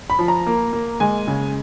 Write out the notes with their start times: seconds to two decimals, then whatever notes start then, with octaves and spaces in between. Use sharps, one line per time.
0.10 B5
0.19 F3
0.28 A#5
0.47 A#3
0.73 A#3
1.00 G#3 G#5
1.27 C#3